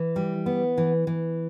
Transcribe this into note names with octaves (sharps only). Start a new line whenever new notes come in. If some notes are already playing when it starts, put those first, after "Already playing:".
Already playing: E3
G3
B3
E3
E3